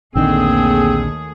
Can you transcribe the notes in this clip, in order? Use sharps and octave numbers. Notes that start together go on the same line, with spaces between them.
A#1 D#2 D3 D#3 A3 C4 G#4